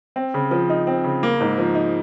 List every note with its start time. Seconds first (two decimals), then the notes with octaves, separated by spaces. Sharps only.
0.16 C4
0.34 C#3
0.51 F3
0.70 D#4
0.87 C4
1.04 C#3
1.23 A#3
1.41 G#2
1.58 F3
1.75 D#4